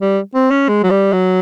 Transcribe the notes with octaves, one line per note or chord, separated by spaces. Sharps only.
G3
C4
C#4
G#3
F#3
G3
F#3